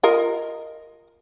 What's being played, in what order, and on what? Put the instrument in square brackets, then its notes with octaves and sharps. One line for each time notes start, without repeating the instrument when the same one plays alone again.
[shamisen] F4 A#4 D#5